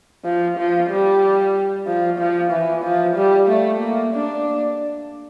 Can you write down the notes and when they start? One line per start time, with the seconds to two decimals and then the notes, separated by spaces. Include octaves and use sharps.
0.24 F3
0.57 F3
0.90 G3
1.87 F3
2.18 F3
2.51 E3
2.83 F3
3.16 G3
3.48 A3
3.80 A#3
4.13 D4